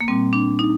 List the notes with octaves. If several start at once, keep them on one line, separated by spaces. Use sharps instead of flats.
A#3
A#2 G3 C4
D4
D#4